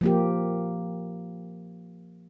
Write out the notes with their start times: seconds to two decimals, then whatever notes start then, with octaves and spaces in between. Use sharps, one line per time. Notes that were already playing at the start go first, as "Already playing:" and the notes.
0.01 F3 A#3 G4